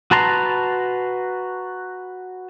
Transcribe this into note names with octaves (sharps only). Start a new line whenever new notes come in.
F#4 B4 A5 A#5 C6